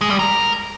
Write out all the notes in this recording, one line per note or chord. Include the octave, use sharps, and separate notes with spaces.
G#3
G3
A#4